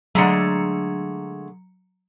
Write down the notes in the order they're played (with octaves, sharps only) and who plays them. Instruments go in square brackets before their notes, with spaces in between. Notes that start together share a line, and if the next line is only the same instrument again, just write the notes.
[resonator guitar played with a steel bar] D3 G#3 A3 [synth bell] F#3 A#5 C#7